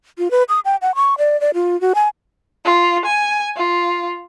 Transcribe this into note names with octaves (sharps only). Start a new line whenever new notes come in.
F4
B4
D#6
G5
F#5
C#6
D5
D5
F4
F#4
G#5
F4
G#5
F4